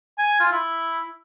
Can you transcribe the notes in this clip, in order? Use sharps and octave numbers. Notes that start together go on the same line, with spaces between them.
G#5
F4
E4